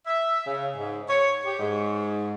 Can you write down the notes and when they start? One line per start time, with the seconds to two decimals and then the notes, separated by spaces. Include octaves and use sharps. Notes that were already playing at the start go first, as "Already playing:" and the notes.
0.07 E5
0.47 C#3
0.76 G#2
1.09 C#5
1.45 G4
1.59 G#2